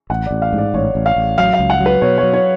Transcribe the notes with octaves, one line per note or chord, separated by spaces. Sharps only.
A1 F#5
A1 D5
F5
G#2
D5
A1 C#5
A1
F5
A1
F#3 F5
F5
C#2
F#5
F#3
B4
B2 C#5
C#5
F#3
C#5